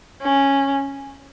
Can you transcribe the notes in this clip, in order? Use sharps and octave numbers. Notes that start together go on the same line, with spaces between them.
C#4